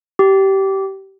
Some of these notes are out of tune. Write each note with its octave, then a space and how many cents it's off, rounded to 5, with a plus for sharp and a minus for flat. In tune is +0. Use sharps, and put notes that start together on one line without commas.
G4 -20